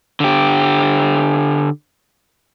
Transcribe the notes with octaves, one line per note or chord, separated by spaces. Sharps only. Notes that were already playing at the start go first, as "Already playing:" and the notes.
D3 G4